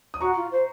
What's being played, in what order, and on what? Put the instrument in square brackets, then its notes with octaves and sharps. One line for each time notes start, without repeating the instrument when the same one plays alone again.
[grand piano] D#6
[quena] F#4 [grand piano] A#5 C#6
[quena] F4
C5